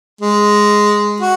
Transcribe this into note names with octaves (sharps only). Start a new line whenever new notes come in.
G#3
F#4